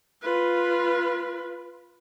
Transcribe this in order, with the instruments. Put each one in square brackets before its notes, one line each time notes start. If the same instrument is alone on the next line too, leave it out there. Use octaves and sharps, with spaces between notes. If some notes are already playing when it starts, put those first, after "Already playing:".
[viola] F4 B4